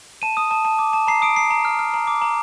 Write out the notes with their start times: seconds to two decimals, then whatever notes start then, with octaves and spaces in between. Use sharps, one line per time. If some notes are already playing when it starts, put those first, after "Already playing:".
0.22 A5 D#7
0.37 D#6
0.51 A5
0.65 A5
0.79 D6
0.93 A5
1.07 A#5 C7
1.22 D#6 D7
1.36 A#5 C7
1.51 A#5
1.65 F6
1.79 F6
1.94 A#5
2.07 D6
2.22 A#5